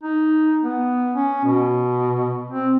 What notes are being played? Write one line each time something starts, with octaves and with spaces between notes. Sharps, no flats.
D#4
B3
C#4
B2
C4